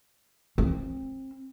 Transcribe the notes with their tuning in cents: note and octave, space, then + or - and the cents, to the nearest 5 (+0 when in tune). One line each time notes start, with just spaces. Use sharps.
C4 +25